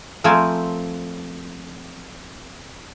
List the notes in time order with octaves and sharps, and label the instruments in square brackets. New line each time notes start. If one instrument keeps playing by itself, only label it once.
[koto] F3 A3 C4 A4 A#4 G#5